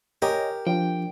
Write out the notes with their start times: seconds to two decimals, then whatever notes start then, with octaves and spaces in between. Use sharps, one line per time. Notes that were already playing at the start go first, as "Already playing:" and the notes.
0.22 G4 A#4 C#5 D#5 G#5
0.67 F3 D4 G5